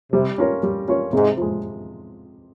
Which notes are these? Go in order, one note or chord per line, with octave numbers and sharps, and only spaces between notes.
C3 G3
C#4 F4 A#4 C#5
G3
C#4 F4 A#4 C#5
G#2 C3
F3 G#3